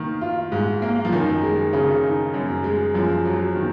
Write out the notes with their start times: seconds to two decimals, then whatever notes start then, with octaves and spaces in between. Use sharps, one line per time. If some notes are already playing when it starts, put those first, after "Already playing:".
Already playing: D#3 A#3
0.21 F4
0.52 G#2
0.82 A#3
1.05 F3
1.12 F#2 D#3
1.43 G#3
1.73 C#3
2.04 D#4
2.34 F#2
2.64 G#3
2.94 F#2 F3
3.26 F#3
3.56 D#3